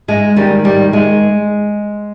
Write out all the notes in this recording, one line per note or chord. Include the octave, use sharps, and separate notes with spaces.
G#2 G#3
D#3 G3
G#2 G3
D#3 G#3